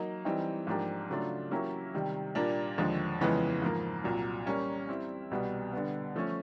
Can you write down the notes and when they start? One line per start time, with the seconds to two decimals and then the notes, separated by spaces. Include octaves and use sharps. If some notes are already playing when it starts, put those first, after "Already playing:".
Already playing: F#3 A#3 D#4
0.25 E3 G3 C4 D#4
0.67 G#2 F3 A#3 D4 G4
1.10 C#3 F#3 A3 D4 F4
1.51 F#3 A#3 C#4 E4 G4
1.94 C3 D#3 G3
2.35 A#2 G3 A#3 D4
2.78 D#2 D3 F3 G#3
3.20 F2 C#3 E3 G#3 B3
3.62 G#2 F3 A#3
4.04 C2 A#2 F#3
4.46 G3 A#3 C#4
4.88 G3 C4 E4
5.31 C2 B2 G3 B3
5.73 D3 G3 B3
6.15 F3 A3 C#4